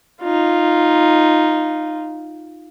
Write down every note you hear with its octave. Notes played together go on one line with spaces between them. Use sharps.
D#4 F4